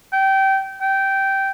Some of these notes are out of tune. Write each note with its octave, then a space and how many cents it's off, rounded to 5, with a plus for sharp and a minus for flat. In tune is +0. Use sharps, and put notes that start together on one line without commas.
G5 -20
G5 -15